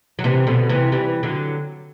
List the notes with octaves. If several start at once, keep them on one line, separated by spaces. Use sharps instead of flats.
F#3
C3 E3
B2 D3
C3 E3
E3 G3
D3 F#3